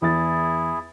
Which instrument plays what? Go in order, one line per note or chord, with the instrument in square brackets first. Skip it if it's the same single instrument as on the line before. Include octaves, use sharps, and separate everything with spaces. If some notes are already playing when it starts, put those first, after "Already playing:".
[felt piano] E2 A6 [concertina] E4 G#4